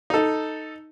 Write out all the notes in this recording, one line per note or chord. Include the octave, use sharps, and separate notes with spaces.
D#4 A4